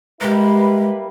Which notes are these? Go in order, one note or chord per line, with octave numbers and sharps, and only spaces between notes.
G3 G#3 A#3 E4 B4